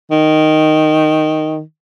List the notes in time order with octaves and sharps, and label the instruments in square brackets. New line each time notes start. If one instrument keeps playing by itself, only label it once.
[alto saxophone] D#3